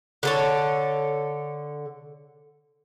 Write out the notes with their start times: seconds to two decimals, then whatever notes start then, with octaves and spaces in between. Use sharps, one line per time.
0.23 D3 A4 C#5